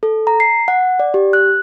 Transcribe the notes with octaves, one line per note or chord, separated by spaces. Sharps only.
A4
A#5
C7
F#5
D5
G4
F#6